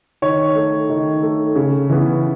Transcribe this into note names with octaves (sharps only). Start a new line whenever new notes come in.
D#3 C#5
A3
D#3
A3
C#3
E3 B3